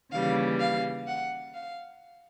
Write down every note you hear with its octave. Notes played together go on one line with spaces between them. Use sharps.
D#2 C#3 E3 G3 F5
F5
F#5
F5